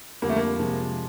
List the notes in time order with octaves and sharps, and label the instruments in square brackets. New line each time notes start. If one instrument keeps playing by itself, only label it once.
[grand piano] F2 D3 G3 [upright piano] A#3
[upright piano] A3
A#3
[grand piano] C3 F3 G#3